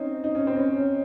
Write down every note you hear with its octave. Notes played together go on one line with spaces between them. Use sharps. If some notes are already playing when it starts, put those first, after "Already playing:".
Already playing: C4 C#4 D#4
D#4
C#4
C4
C#4
C#4